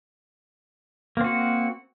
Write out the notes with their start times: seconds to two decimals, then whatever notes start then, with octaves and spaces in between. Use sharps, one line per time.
1.17 A#3
1.21 C4
1.24 F#4